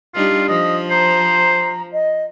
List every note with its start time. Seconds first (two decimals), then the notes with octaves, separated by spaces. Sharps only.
0.15 G3 D4 D#4 F4
0.48 F3 D#5
0.91 C5 A#5
1.92 D#5